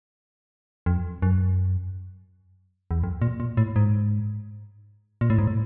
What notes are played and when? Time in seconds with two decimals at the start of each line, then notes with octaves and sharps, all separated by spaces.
0.86 F2
1.22 F#2
2.91 E2
3.04 F2
3.22 A#2
3.40 A#2
3.57 A2
3.76 G#2
5.21 A#2
5.30 A2
5.38 G#2
5.47 A2